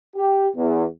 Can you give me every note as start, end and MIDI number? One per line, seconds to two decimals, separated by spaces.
0.16 0.48 67
0.56 0.84 40